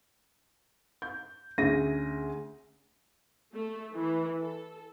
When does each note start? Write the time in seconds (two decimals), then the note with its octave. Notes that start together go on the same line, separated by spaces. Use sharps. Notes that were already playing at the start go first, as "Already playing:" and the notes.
1.02 G6
1.58 D2 C#4 G#4 E5 A#6 D#7
3.55 A3
3.93 E3
4.42 A4